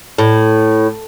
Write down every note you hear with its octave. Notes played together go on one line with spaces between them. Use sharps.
A2